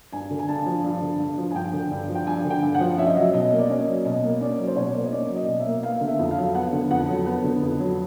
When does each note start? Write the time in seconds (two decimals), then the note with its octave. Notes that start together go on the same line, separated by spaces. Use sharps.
0.12 G2 G#5
0.31 D3
0.39 G#5
0.48 G2 A5
0.66 F3
0.84 G2
1.02 D3
1.20 G2
1.38 F3
1.51 G#5
1.55 G2 G5
1.73 D3
1.91 G2
2.09 F3
2.15 G5
2.27 G2 G#5
2.45 D3
2.50 G5
2.62 G2
2.74 F#5
2.80 F3
2.98 C#4 E5
3.07 D#5
3.15 F#3 E5
3.34 B2 D#5
3.52 A#3
3.58 D5
3.69 C#4 D#5
3.88 F#3
4.05 B2 D#5
4.23 A#3
4.41 C#4 D5
4.59 F#3
4.67 C5
4.76 B2 C#5
4.94 A#3
5.05 D#5
5.12 C#4 D5
5.30 F#3
5.36 D#5
5.48 B2
5.60 E5
5.66 A#3
5.83 B3 F5
6.01 D3
6.07 E5
6.19 F2
6.31 F5
6.37 F#3
6.55 B3 F#5
6.73 D3
6.91 F2 F#5
7.08 F#3
7.26 B3
7.44 D3
7.62 F2
7.79 F#3